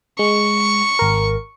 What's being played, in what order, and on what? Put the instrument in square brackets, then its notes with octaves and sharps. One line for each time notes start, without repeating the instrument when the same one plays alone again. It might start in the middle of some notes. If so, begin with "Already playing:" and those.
[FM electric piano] G#3 [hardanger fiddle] C#6
[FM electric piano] G#1 A#4